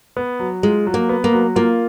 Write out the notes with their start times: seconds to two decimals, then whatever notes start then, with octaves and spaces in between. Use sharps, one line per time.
0.17 B3
0.39 F#3
0.63 G#3 F4
0.87 F#3
0.94 A#3
1.09 B3
1.24 A#3
1.33 F#3
1.56 A#3 F4